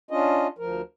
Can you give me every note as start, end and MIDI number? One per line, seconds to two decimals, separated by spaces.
0.11 0.47 61
0.11 0.47 62
0.11 0.47 65
0.11 0.47 75
0.58 0.82 38
0.58 0.82 53
0.58 0.82 70